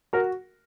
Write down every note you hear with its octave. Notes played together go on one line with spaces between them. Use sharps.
F#4 A#4